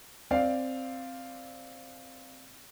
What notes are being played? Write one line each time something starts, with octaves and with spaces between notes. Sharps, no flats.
C4 D5 F5